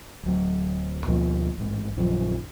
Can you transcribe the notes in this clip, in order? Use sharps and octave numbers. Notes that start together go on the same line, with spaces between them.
D1 F#3
D2 B2 F3 A#3
A1 G#2
A#1 F#2 D#3 F3